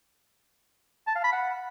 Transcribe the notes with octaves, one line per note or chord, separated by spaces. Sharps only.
A5
F5
B5
F#5